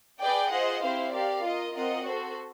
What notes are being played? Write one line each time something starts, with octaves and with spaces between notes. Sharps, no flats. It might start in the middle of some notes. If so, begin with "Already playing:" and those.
G#4 B4 D5 G5
F4 G#4 C5 D#5 F#5
C4 E4 G4 C5 F5
G4 A#4 D5 F5
F4 A#4 D#5
C4 F4 A#4 D#5 F#5
F#4 A4 C5